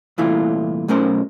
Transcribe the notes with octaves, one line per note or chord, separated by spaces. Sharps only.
C2 A#2 E3 A3 E4 F4
B1 A3 C#4 A#4 C5